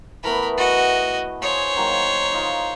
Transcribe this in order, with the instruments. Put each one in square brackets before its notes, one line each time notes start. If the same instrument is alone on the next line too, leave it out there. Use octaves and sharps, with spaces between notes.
[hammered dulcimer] E3 A3 B3 [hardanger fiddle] A#4 B5
[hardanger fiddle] F#4 D#5
[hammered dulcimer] G#4 G#5 A#5 [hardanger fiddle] C5 C#5
[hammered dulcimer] D#3 F#3 A#3
D#4 F4